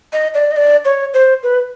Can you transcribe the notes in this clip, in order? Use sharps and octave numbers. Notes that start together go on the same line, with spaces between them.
D#5
D5
D#5
D5
C#5
C5
B4